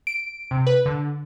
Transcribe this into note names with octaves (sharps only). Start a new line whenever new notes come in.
D7
C3
B4
D3